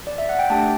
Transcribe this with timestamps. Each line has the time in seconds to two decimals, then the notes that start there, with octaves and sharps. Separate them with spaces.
0.07 D5
0.18 E5
0.29 F#5
0.39 G5
0.50 A3 D4 G4 A5